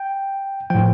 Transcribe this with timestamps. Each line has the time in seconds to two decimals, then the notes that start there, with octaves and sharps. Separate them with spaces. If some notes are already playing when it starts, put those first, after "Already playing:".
Already playing: G5
0.70 A2 F3 G5